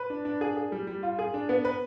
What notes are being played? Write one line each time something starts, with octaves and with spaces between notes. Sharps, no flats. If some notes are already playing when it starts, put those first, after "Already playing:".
Already playing: B4
D4
D4
G#4
G#4
G3
G3
F4
G#4
D4
B3
B4